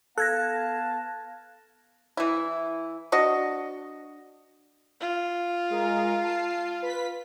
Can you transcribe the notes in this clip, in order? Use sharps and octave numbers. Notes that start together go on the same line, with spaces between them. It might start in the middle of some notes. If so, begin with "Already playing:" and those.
B3 A4 F5 A5 F#6 G#6 A#6
E3 E4
D4 F#4 D#5
F4
G#3 G#4 A#4
A5 C7
B4 B6